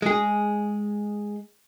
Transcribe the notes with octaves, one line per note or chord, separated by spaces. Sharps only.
G#3 G#4